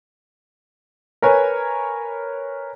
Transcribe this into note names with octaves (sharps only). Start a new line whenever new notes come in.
A#4 B4 C#5 G#5